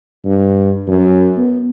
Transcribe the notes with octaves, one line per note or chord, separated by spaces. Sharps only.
G2
F#2
B3